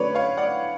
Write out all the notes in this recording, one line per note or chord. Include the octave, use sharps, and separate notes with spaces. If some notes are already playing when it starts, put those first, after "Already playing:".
Already playing: D3 F#3 A3 B4 C#5 D5
C#5 F5
D5 F#5